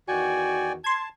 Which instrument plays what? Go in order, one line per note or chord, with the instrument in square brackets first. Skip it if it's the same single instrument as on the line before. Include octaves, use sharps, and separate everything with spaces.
[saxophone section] E2 D#3 F#4 [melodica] D5 G5 [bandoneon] G#5
[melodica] A5 [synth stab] C6 G#6